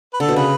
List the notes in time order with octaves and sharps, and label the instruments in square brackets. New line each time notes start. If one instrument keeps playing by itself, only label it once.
[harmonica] B4
[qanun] D3 [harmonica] A4
[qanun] B2
[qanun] C#3 [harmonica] B4